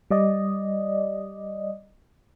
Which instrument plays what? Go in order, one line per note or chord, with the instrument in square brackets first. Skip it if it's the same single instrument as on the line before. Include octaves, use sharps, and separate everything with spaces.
[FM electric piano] G3 D5 D#5